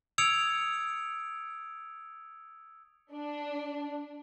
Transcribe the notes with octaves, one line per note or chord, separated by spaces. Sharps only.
D#6 E6 G#6 C#7 D7 F7
D4